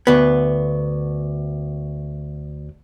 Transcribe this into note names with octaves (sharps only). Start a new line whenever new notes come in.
D2 B3